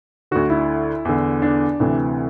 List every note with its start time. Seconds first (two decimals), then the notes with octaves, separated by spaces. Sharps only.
0.31 D2 D3 F#4
0.50 E4
1.05 E2 D3
1.42 D4
1.80 D2 C3 E3